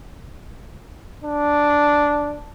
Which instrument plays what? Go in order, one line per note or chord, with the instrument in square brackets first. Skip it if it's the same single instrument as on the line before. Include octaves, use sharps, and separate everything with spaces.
[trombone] D4